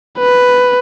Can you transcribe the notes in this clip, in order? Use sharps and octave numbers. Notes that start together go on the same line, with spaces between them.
B4